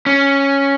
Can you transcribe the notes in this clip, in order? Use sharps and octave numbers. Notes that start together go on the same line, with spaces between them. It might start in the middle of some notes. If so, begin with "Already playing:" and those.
C#4